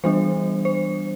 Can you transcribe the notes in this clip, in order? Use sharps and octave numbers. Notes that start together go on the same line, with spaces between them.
E3 G3 B3 D4 C5
C5